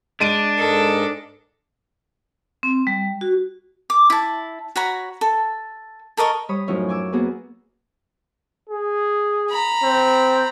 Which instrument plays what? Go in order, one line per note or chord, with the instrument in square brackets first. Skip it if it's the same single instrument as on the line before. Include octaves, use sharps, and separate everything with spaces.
[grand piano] G#3 D7 D#7 [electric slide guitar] D4
[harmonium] G#2 A#4 D#5 [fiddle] A4
[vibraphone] C4
G3
F#4
[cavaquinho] D6
E4 A5
F#4 C#5 A#5 B5
A4
A4 A#4 D#5 C#6
[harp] G3 C#5 B5 D#6
F#2 A2 F3 C#4 D#4 E4
G#5 D6 E6
A#3 B3 F#4 G#4 B4
[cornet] G#4
[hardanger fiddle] A#5 B5
[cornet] C4